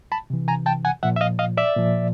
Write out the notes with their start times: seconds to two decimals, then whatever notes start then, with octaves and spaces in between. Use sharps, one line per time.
0.12 A5 B5
0.30 C3 E3
0.48 G#5 A#5
0.66 G5 A5
0.85 F#5 G#5
1.03 A#2 F3 E5 F#5
1.16 E5
1.21 D#5 F5
1.39 D#5 F5
1.57 D5 E5
1.76 A#2 F3